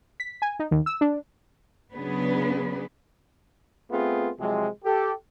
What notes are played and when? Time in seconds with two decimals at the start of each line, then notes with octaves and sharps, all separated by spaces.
0.20 B6
0.42 G#5
0.59 D#4
0.71 D#2
0.86 E6
1.01 D4
1.94 C#3 F#3 B3 D4 G#4 B4
3.90 A3 B3 C4 F4 G#4
4.38 C3 F3 F#3 G#3
4.84 G4 A4